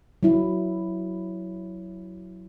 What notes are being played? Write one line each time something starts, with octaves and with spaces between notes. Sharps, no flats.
F#3 E4